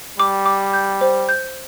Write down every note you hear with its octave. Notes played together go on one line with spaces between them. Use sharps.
G3 D6
D6
G6
C5
G6